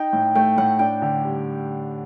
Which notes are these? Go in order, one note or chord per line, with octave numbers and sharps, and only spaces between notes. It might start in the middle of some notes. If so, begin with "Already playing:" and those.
Already playing: D#4 G5
A2
A3 G5
A2 F#5
D4 G5
D3
G3